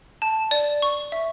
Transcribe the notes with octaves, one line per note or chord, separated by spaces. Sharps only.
A5
D5
C#6
E5